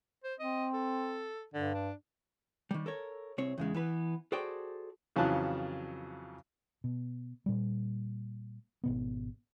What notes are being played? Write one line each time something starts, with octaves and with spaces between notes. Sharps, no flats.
C5
C4 D#5
A4
G2 D3
D4
D#3 G3
A4 A#4 C#5
C2 C4 C#5
E2 C#3 G#3
E3 B3 B4
F#4 G#4 A4 C5 D5 G5
F2 C#3 E3 F#3 A5 F#6
B2
A#2 G3
G#1 B2 B3